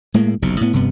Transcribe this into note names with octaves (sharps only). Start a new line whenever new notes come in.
A2 G#3 A#3
F#1 B1 C3
A2 B3
F1 G2 C3 B3